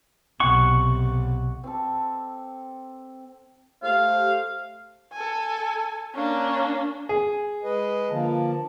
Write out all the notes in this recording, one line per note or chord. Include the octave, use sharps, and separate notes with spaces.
B1 C3 F#5 C#6
C4 G4 A4
A3 G4 C5 F5
A4 G#5
A#3 C#4 D4
G#4
G#3 B4 D#5
D3 F3 A#3 A5